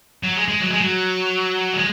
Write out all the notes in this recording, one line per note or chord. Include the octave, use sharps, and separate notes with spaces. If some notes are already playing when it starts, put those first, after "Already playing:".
F#3
G#3
G#3
F#3
G#3
F#3
G#3